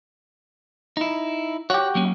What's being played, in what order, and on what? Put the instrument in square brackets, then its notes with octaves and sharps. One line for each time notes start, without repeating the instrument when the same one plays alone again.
[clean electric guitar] D#4 E4
[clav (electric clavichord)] F#4 G4 [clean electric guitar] C#5 F#5
[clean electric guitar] F#3 A#3 C#4